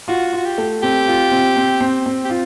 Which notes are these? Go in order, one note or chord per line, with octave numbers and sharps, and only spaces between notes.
F4 F#4
F4 F#4
G4
A3
C4 G4
F4
C4
C4
C4
C4
G4
F4